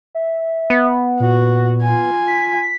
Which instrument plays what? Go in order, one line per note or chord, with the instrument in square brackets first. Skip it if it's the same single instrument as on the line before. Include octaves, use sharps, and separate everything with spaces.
[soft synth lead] E5
[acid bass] B3
[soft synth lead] A#2 [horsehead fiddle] F#4
[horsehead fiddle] F4 G#5
[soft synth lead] B6